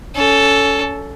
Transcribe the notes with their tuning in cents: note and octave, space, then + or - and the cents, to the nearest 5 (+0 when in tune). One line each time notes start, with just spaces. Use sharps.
C#4 +25 A4 +0